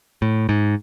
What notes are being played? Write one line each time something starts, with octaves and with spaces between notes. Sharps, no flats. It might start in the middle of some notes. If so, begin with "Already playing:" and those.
A2
G#2